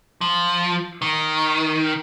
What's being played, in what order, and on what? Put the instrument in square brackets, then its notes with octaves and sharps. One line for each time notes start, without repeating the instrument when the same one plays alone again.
[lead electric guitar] F3
D#3